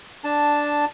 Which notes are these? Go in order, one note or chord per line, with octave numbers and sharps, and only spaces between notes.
D4 A5